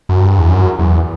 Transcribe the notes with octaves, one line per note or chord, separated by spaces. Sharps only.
F#2
G2
E2
F#2
E2